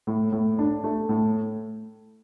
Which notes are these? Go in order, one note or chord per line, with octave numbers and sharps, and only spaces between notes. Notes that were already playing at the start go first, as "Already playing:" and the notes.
A2
A2
D4
A3
A2